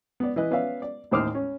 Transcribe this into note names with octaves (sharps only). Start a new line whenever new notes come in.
B3 D5
E3 B4 D#5 F#6
B3 C#4 B4 D5 E5 F5
D5
A1 D#2 C5 D6 D#6 F6
C#4